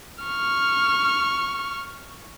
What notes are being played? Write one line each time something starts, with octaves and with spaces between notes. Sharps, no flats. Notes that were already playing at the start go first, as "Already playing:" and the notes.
C#6 F6